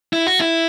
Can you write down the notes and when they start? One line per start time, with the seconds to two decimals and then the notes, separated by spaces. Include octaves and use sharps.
0.13 E4
0.27 F#4
0.39 E4